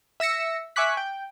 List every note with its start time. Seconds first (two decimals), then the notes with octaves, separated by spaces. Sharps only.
0.20 E5 E6 A#6 C#7
0.76 E5 G#5 C#6 D6 F#6 B6
0.97 G5